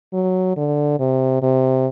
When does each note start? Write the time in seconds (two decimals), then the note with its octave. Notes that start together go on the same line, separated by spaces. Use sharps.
0.13 F#3
0.57 D3
0.99 C3
1.42 C3